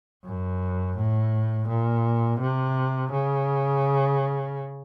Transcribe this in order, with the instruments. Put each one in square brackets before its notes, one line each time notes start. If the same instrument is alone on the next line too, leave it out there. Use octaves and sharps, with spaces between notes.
[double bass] F#2
A2
A#2
C3
C#3